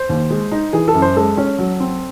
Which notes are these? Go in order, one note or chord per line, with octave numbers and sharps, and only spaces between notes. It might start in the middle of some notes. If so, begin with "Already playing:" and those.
Already playing: C5
D#2
G#3
D#4
E3 G#4
A4
F#2
C5
G#3 A4
C#4
F#3
C4